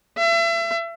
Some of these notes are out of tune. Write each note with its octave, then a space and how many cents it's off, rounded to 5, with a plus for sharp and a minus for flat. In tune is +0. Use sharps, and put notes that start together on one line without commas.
E5 +35